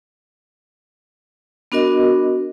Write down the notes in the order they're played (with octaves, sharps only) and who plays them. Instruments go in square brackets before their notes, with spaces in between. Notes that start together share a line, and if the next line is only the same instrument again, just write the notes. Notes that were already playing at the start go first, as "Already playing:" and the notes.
[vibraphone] B3 D4 F#4 A#4 D#5